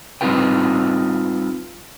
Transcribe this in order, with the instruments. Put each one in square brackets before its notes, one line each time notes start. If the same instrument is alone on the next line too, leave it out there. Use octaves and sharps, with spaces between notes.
[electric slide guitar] G3 C4 D#4 F4 B4 G5